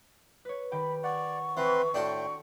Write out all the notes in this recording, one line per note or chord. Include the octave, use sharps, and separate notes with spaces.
B4 C#5
D#3 G4 G5 B5
D5 F#5 C#6
E3 C4 B4 C6
A2 A3 D4 F#4 A4 G5 C6